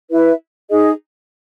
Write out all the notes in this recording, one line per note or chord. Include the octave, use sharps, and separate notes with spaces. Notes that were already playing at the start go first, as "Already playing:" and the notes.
E4 B4 E5
D#4 G#4 D#5